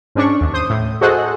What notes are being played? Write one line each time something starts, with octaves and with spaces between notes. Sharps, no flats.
G#2 C#4 D4 C#6
D#2
C5 D#6
A2
F#4 G#4 A4 C5 D#5 F#5